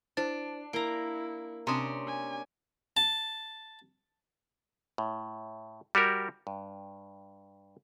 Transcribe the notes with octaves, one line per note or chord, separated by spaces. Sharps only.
D4 E4 C5 A6
A#3 E4 A#5 D7 G7
C3 C#4 D4 A#5 C6 D#6
G#5
A5
A2
G3 F#4 G4 A#4
G2